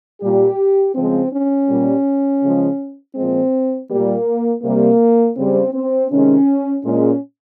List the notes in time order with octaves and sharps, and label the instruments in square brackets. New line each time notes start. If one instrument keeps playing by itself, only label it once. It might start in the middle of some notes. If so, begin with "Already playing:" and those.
[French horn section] A#2 G3 G4
C#3 F3 G#3 C4
C#4
A#2 G3
C#3 F3 G#3
A#2 F3 G#3 C4
A#2 G3 A#3
C3 G3 A#3
C#3 G3 C4
C4
C3 D#3 G#3 C#4
A#2 G#3 C#4